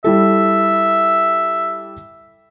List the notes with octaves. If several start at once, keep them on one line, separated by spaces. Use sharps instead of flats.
G3 E4 A4 E5